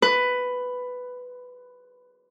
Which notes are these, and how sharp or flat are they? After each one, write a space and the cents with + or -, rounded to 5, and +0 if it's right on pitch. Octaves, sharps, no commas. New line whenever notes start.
B4 +10